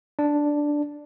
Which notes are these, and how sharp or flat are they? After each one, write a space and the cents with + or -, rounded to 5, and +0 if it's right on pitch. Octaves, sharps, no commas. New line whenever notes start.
D4 +0 D5 +0